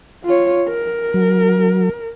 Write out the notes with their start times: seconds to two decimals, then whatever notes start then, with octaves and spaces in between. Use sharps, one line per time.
0.24 F4 C#5
0.68 A#4
1.14 F#3